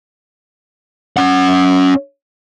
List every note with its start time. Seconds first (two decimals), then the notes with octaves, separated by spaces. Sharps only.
1.17 C#4 F#5